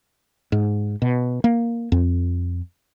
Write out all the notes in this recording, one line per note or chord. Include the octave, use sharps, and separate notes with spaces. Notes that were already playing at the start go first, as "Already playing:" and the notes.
G#2
B2
A#3
F2